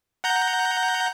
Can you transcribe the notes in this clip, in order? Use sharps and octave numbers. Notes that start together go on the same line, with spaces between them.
F#5 A#5 G6